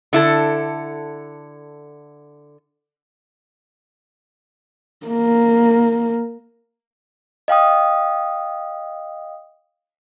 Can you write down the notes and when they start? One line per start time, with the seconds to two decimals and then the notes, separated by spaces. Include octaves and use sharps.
0.13 D3 E4 A4
5.07 A#3
7.48 D#5 F5 G5 D#6